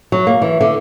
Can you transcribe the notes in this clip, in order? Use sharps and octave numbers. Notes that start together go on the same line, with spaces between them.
F#3
A#3
E3
D3